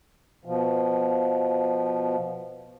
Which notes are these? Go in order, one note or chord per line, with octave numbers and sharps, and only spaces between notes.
B2 F3